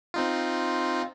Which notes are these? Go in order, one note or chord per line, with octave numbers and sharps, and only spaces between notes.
C4 D#4 F4